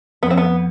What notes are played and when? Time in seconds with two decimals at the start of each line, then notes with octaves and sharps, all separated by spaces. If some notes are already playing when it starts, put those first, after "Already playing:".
0.23 F2 B3
0.30 C4
0.38 B3